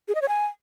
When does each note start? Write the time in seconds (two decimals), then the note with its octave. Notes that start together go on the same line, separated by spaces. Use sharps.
0.08 G#4
0.15 D#5
0.22 C#5
0.28 G#5